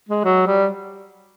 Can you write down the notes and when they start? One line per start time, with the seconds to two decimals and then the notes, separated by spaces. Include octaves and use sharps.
0.09 G#3
0.24 F#3
0.47 G3